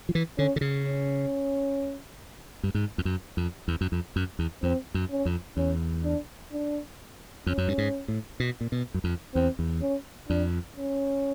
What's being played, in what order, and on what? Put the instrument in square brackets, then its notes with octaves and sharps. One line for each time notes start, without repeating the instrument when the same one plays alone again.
[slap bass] F3
E3
[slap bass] D3 [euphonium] C#4
[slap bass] D3
C#3
[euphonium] C#4
[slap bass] G2
G#2
F2
F#2
F2
E2
F#2
F2
F#2
E2
[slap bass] F2 [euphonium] C4
[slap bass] F#2
[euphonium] C#4
[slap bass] F2
[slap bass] E2 [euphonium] C#4
[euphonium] D4
D4
[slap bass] F2 [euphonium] C#4
[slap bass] F#2
G2
G#2
A2
B2
A#2
B2
F#2
F2
[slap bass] E2 [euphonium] C4
[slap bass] E2
[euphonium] C#4
[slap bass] F2 [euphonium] D4
[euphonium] C#4